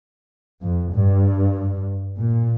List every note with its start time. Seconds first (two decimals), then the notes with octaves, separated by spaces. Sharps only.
0.62 F2
0.93 G2
2.18 A#2